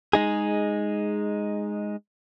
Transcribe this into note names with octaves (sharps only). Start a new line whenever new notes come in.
G#3 D#4 G#4